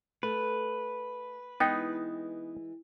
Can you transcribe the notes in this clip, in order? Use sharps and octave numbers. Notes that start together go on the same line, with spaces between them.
A3 B4
E3 G#3 B3 D#4 G5